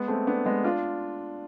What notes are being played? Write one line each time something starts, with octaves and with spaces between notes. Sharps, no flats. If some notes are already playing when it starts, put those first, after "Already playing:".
Already playing: G#3 B3
A3 C4
B3 D4
G#3 B3
D4 F4